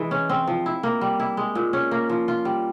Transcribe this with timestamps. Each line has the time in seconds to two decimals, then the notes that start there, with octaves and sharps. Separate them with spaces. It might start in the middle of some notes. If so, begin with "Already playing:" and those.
Already playing: E3 G#3
0.11 C#4
0.29 C4
0.47 F3
0.66 E4
0.83 A#3
1.01 G3
1.20 E4
1.37 G#3
1.55 A#2
1.73 C#4
1.91 A#3
2.09 F3
2.28 F4
2.45 G3